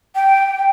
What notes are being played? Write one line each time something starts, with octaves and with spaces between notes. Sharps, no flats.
G5